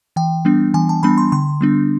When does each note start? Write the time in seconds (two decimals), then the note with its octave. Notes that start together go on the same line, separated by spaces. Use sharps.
0.16 E3 G5
0.45 G3 B3 D4
0.74 E3 G#5
0.89 A5
1.03 G3 B3 D4 B5
1.18 C6
1.32 D3 C6
1.61 G3 B3 D4